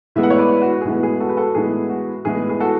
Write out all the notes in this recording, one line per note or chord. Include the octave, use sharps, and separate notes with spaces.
A2 E3 G#3 B3 E5
F#5
C#5 E5
B4 D5
F#4
G#4
A2 E3 G#3 B3 F#4
G#4
F#4 A4
B4
F#4 A4
A2 E3 G#3 B3 G#4
F#4
A2 E3 G#3 B3 G#4
G#4
F#4 A4